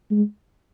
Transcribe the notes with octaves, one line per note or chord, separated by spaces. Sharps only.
G#3